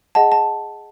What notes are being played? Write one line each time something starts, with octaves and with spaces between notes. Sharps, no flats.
G#4 D#5 F#5 A5
A5